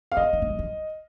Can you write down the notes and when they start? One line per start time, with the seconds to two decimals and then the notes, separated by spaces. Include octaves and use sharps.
0.12 F5
0.17 C4 D#5
0.33 C4
0.42 A#3
0.50 G3
0.59 F3